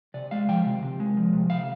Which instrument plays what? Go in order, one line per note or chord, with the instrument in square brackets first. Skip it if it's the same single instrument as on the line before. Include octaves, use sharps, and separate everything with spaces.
[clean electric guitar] C3 D5
G#3 F5
F3 G5
C3
C3
G#3
F3
C3
C3 F5